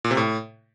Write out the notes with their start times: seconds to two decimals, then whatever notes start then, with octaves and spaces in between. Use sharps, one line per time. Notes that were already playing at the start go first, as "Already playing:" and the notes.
0.04 A#2
0.11 C3
0.17 A2